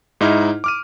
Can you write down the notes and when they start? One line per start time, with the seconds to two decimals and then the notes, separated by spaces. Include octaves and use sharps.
0.21 G#2 D#4 E4 F6
0.64 D6 F6 D#7